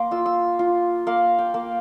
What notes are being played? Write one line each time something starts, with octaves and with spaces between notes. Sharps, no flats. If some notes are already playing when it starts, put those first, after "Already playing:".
Already playing: A#3 C6 D6
F4 E6
E6
F4
A#3 F5
G5
A#3